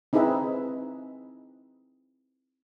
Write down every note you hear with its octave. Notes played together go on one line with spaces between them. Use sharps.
C4 D#4 E4 G#4 B4 E5